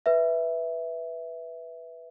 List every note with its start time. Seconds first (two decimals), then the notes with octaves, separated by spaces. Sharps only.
0.06 B4 E5